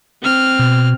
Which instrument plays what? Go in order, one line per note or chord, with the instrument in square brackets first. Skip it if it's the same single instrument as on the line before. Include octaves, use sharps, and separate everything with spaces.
[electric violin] C4 F6
[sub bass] B2